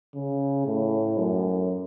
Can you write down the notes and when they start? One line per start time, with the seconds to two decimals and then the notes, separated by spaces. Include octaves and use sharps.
0.15 C#3
0.66 A2
1.18 F#2